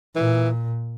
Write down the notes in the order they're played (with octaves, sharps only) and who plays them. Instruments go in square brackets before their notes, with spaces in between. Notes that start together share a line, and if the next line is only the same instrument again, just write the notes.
[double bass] A#2 [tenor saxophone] E3